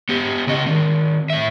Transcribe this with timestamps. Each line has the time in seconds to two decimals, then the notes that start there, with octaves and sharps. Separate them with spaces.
0.09 B3 G4
0.47 C#3 C#4 D#5
0.66 D#3 C4
1.30 A2 E5